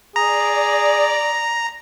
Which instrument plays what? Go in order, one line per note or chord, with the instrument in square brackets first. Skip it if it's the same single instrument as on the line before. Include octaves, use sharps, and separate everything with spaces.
[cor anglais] G#4 [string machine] D5 [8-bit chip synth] A#5